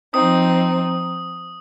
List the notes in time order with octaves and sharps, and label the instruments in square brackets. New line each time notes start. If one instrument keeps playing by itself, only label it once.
[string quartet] F3 C4 D#4 [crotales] D#6